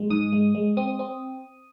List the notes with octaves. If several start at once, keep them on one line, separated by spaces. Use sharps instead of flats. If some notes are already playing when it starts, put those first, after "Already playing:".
Already playing: G#3
G#2 D#6
G#3
G#3
C4 D#6
C4